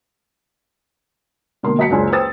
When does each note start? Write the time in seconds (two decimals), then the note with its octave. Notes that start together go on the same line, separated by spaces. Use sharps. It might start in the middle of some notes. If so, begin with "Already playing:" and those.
1.63 B2 D3 A#3 C6
1.78 F#3 D#5 A5 B6 C#7
1.90 F#1 C#2 D4 G#5 C6
2.12 B4 C5 G5 D#6 E6 A6